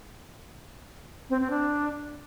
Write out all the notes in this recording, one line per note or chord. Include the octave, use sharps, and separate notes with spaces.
C4
C4
D4